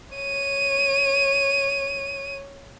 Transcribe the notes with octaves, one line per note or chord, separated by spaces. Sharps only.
C#5 D#7